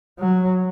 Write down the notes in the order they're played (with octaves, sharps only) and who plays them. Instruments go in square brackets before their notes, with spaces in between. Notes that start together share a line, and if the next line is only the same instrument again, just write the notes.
[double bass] F#3